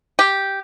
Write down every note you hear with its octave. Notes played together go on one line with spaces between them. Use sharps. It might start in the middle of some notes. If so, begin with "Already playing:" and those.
G4